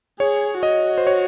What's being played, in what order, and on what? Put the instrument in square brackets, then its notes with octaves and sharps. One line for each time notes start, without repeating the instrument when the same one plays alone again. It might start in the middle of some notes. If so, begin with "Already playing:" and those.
[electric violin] G#4 [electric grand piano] C#5
[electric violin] F#4 [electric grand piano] D#5
[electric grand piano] C5
C#5